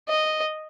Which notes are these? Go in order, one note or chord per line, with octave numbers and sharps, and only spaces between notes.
D#5